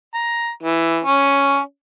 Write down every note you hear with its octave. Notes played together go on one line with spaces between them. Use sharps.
A#5
E3
C#4